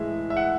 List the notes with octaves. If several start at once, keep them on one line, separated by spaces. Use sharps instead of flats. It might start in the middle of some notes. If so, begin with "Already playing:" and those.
Already playing: A2 E3 G#3 E5
E5
F#5